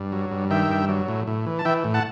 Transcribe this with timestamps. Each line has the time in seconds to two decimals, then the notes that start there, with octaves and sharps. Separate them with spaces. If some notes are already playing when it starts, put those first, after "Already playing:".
Already playing: G2
0.12 F#3
0.31 G2
0.50 D#3 E5 G5
0.69 G2
0.89 F#3
1.08 A2
1.27 A2
1.46 E3
1.59 A5
1.65 E3 E5 G5
1.84 A2
1.94 F#5 A5